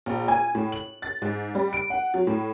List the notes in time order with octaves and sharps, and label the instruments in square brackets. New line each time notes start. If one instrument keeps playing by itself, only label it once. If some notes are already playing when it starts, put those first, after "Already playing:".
[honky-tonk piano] A#1
G#5
A2
F#7
A6
G#2
G3
D7
F#5
F#3
A2